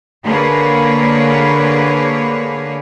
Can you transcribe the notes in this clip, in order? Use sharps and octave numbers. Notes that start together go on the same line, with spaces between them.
D3 A#3 G#4 B4 C#5